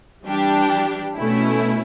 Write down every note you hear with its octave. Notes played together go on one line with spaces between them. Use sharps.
E3 G3 D4 G4
B2 A3 C#4 E4